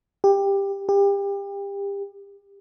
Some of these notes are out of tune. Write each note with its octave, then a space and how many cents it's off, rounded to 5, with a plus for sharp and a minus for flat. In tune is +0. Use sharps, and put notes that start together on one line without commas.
G4 +15
G4 +30